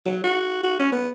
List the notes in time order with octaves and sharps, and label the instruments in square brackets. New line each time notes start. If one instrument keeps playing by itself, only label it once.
[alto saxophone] F#3
F#4
F#4
C#4
B3